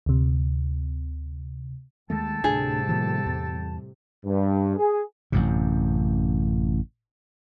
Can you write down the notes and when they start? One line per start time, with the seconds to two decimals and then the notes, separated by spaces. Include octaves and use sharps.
0.06 D2 C3
2.10 D#2 D#3 G#3 A3 A4 G5 A5
2.44 D2 A2 C3 G3 D4 G#4
2.89 D#3 F3 A#3
3.26 E2
4.25 G2
4.77 G#4
5.32 A1 F#2 C3